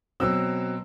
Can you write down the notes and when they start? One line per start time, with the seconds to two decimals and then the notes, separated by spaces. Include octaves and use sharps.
0.20 B2 F#3 C4 E6